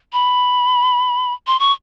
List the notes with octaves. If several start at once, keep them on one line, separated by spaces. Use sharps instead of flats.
B5
C6
C#6